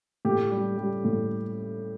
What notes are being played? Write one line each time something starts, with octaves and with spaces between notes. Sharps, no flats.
A2 G4
G3
G3
A2